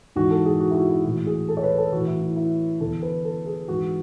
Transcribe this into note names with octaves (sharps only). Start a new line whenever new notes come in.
G#2 E3 F#4
A4
G#4
F#4
E4
F#4
E4
A2 E3 F#4
G#4
A4
C#5
B4
A4
A2 E3 F#4
E4
E4
E4
E2 D3 A4
B4
A4
G#4
G#2 E3 F#4